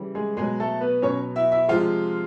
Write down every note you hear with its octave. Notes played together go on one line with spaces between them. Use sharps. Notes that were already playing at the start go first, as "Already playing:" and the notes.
Already playing: C#3 E3 G3
G#3 G#4
B2 F#3 G#3 G#4
A3 A4
B3 B4
B2 F#3 C#4 C#5
E4 E5
E4 E5
C3 F3 G#3 F4 F5